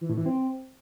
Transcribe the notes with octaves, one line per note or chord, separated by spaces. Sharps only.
E3
A2
E3
C4